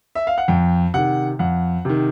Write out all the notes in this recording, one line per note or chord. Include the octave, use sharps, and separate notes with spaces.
E5
F5
F#5
F2 G5
C3 D#3 F#5
F2 F#5
C3 D#3